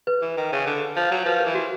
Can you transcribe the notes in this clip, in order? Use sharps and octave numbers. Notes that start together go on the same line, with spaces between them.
B4
E3
D#3
C#3
D3
F3
F#3
F3 B4
E3 A#4
F#4